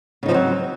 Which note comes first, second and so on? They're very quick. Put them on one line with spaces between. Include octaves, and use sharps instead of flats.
C#3 D#4 F3 C4 F#3